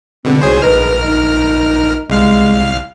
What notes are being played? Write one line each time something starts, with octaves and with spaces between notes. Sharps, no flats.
B2 D3 G#3 C4
C2 G#2 F#4 G#4 C5 C#5
A#1 D#4 G#4 A#4 B4 F6
D#4
C2 G#3 F5 F6